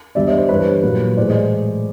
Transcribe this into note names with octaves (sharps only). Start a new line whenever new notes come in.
G2 D3 G3 B3 D5 E5
C#5 D#5
C5 D5
G2 E3 G3 B4 C#5
A#2 F#3 A#3
A2 E3 G#3 C5 D5
D#5